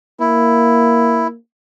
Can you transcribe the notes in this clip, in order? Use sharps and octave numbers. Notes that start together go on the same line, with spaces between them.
A#3 E4